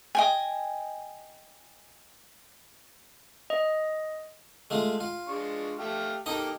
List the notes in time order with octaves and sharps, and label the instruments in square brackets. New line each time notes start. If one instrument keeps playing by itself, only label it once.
[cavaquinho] D#5 G5 G#5
[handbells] D#5
[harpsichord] G#3 A3 F4
F4
[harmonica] G#3 D4 C#6
A3 G4 F5
[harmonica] A#3 G4 A4 [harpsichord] D#4 D#5 A#5